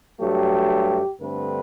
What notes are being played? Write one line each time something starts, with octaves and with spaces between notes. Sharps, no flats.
G2 F#3 A3 G4
G2 D3 A3 C4 B4